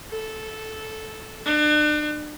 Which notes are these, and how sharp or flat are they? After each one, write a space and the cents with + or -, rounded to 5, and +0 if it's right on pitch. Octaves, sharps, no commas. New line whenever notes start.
A4 -10
D4 +35